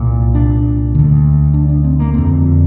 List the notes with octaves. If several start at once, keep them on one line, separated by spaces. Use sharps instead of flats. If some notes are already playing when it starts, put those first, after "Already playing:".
Already playing: C2 A#2
D4
D2 D3
D4
D4
C4
A#3
F2 D3 C4